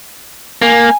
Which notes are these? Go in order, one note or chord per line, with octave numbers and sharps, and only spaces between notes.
A#3 G#5